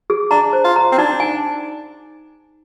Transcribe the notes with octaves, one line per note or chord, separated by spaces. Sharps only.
G#4
D4 A#5
C5
F4
A#5
C4
D4 D#4
G#5